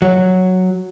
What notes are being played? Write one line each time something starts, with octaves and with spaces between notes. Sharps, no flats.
F#3